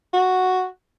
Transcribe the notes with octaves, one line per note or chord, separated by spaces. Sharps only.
F#4